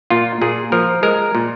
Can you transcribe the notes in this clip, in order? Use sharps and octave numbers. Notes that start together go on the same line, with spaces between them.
A#2 F4
A#2 G#4
F3 A#4
G#3 A#4
A#2